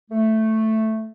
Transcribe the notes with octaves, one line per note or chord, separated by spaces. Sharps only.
A3